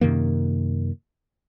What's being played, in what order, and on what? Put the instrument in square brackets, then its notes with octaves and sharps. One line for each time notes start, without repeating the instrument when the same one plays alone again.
[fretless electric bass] F#2 C3 D#3 A#3